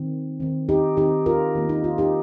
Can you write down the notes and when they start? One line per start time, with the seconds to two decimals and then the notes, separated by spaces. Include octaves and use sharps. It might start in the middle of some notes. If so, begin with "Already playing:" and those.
Already playing: D#3 C4
0.40 D#3 C4
0.69 D#4 G4
0.97 D#3 C4 D#4 G4
1.26 F4 A#4
1.55 D#3 A#3
1.69 D#4
1.84 F4
1.98 D#4 G4